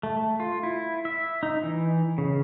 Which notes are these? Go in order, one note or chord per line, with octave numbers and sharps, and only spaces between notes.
A3
F4
E4
E5
D#4
E3
C#3